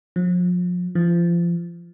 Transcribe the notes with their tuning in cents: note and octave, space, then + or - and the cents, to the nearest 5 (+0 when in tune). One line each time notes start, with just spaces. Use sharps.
F3 +35
F3 -30